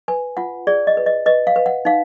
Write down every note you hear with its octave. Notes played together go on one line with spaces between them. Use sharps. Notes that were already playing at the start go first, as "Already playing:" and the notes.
B4 G#5
F4 F#5
G#4 D5
D#5
B4
D#5
B4 D#5
F5
B4
F#5
D#4 F5